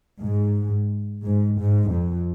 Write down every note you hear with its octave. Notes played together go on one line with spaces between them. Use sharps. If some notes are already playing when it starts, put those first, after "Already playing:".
G#2
G#2
G#2
F2